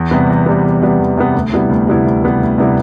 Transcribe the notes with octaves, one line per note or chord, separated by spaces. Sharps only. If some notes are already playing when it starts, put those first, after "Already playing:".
Already playing: E2
C3 G3 B3
E2
C3 G3 B3
E2
C3 G3 B3
E2
C3 G3 B3
D2
C3 G3 B3 E4
D2
C3 G3 B3 E4
D2
C3 G3 B3 E4
D2
C3 G3 B3 E4